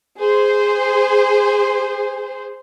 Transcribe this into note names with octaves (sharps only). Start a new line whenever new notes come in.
G#4 C5